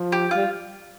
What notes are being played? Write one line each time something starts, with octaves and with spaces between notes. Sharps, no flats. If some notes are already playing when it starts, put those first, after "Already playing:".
Already playing: F3
G4
G3 F4